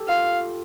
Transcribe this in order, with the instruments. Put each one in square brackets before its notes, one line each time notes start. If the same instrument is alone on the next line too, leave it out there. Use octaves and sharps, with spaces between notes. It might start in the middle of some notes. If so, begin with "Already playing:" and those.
Already playing: [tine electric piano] G4 A4
[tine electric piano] F4 [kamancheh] F5